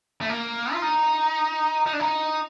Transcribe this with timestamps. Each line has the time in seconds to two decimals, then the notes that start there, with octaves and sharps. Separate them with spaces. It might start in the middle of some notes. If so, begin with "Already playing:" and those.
0.21 A3
0.29 A#3
0.73 F4
0.82 D#4
1.86 D#4
1.93 D4
2.00 D#4